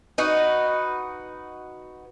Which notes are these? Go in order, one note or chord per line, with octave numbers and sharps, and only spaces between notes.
D#4 F#4 B4